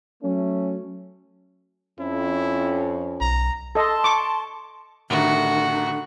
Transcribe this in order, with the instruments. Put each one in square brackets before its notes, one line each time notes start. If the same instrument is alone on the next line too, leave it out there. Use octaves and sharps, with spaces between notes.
[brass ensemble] F#3 A3 C#4
[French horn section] F2 C#4 [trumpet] E4
[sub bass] B1 [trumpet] A#5
[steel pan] A4 D#5 [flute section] A5 C6
[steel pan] C#6 D6
[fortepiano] A1 D#3 [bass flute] D3 [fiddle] F#4